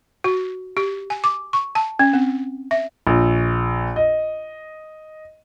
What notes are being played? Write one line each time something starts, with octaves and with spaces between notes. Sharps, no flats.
F#4
G4
G#5
D6
C#6
A5
C#4
C4
E5
A#1
D#5